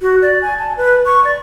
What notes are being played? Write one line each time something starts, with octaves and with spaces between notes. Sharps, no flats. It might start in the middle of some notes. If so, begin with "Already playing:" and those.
F#4
D5
G#5
A5
B4
C#6
D5